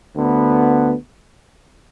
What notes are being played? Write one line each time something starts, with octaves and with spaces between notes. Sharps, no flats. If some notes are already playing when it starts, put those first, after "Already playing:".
D2 D3 B3